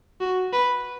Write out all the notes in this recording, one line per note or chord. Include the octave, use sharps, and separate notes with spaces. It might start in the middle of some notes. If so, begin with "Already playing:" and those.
F#4
B4